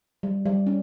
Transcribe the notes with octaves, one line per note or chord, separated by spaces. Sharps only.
G3
G3
C#4